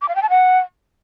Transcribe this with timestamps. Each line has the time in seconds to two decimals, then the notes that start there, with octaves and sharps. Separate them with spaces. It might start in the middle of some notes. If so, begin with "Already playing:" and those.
0.01 D6
0.08 F5
0.16 G5
0.23 A5
0.30 F#5